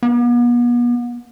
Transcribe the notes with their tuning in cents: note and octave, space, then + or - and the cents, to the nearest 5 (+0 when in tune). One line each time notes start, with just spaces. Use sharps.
B3 -40